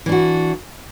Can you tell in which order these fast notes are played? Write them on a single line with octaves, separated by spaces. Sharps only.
E3 D4 F#4